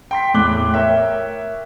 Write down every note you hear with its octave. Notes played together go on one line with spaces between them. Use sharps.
G5 C6 B6
E2 A2 D6 F#6 G7
A#4 C#5 E5 G5